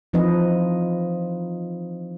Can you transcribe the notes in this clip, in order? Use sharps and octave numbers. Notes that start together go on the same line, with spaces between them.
E3 F3 C4 D#4 B4 D#5